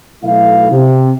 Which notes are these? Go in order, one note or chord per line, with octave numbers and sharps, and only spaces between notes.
B1 A3 E4 F5
C3